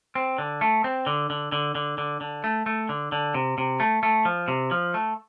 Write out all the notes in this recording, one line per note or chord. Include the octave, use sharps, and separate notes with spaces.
C4
D3
A3
C4
D3
D3
D3
D3
D3
D3
A3
A3
D3
D3
C3
C3
A3
A3
F3
C3
F3
A3